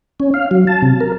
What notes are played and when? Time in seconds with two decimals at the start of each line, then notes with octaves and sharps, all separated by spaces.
0.20 C#4
0.34 F5
0.51 F#3
0.67 A5
0.82 C3
1.01 A#4